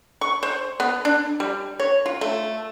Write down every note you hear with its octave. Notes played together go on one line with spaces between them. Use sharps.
C#6
C5
B3
D4
G3
C#5
F4
A3